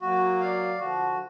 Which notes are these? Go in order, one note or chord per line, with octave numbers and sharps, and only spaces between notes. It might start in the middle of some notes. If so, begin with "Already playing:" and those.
F#3 A#3 F#4
D5 F5
D3 F3 F#4
F#3